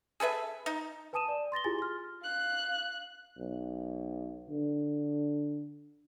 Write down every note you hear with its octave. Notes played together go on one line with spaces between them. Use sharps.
G#4 A4 B4 E5
D#4
B4 G#5 A5 D#6 D#7 E7
D5
C6 A6 A#6 G7
E4 F4 G4 G#4 G#5 A6
C6 F6
F5 F#6
B1
D3